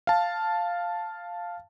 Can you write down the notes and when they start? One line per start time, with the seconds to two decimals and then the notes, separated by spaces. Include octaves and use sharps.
0.07 F5 A5